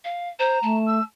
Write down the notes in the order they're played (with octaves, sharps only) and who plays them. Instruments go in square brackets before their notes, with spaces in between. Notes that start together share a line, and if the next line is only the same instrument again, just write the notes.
[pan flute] F5
[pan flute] C5 [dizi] A#5
[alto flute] A3 [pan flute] A5
[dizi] E6